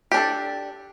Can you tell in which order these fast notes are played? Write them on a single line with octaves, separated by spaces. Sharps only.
G4 D4 A4